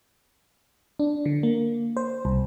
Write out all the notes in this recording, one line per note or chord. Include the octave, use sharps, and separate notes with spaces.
D4
D3
A#3
C5
C2